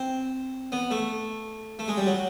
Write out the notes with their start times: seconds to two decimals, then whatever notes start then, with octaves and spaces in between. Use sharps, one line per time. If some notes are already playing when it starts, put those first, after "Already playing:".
Already playing: C4
0.72 B3
0.91 A3
1.79 A3
1.88 G#3
1.97 G3
2.06 F#3